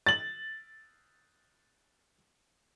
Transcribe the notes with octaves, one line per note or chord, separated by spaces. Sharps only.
A6 F#7